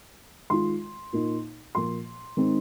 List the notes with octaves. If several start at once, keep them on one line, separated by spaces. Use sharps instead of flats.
D#3 G#3 F4 C6
A#2 A#3 D#4
A#2 F3 A#3 C6
D#3 G#3 C4 D#4